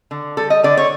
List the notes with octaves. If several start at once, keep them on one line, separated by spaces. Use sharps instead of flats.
D3
G3 A4
D#5
D3 D5
C#5